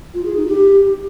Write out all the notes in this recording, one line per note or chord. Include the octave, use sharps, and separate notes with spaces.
F4
G#4
D#4
G4